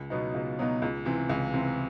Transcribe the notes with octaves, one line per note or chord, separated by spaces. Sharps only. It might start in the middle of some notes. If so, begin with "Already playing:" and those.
Already playing: C#2
B2 F#3 B3 D#4
C#2
B2 F#3 B3 D#4
C#2
C3 E3
C#2
C3 E3